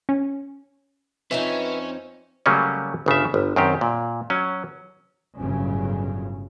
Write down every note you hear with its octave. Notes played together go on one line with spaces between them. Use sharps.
C#4
F2 C4 C#4 D#4 B4 E5
C#3 F#3 G3 A3 A#3 C#4
G1 C#3 D4 E5
G1
F#2 D#3 C4 G4
A#2
F#3 C#4
G1 A2 C#3 F#3